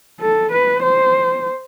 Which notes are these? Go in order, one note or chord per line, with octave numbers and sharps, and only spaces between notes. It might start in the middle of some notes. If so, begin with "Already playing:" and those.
A4
B4
C5